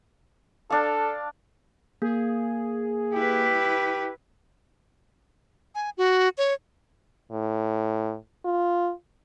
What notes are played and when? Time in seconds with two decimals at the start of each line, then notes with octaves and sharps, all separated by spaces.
0.70 D4 A4 F5
2.02 A#3 G#4
3.13 E4 G4 B4
5.75 G#5
5.98 F#4
6.38 C#5
7.31 A2
8.45 F4